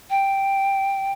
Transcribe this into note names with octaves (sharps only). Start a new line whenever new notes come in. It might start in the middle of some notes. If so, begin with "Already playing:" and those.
G5